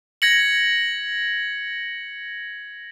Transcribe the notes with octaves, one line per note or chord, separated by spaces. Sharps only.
G#6 A#6 C#7 F#7